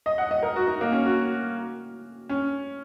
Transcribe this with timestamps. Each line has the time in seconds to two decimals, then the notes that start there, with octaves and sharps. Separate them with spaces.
0.06 D#5
0.18 F#5
0.31 D#5
0.43 A#4
0.56 F#4
0.67 D#4
0.81 A#3
0.92 C#4
1.06 F#4
2.29 C#4